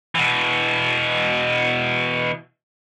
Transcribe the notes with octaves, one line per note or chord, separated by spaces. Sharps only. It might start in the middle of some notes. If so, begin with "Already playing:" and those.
B2 E3